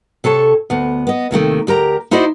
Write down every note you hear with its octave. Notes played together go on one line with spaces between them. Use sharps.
C3 A4 C#5 A5
D2 B3
B3 D#5
D#2 C3 D#3 A3
D2 G4 A#4 A#5
D#4 E4 F#4 C5 D5 D#5